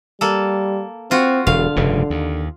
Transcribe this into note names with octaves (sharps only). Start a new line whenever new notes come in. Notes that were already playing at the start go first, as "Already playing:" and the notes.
G3 A#3 A4
C4 F4 F#4
E1 D3 F5
F1 G2 C#3
D#2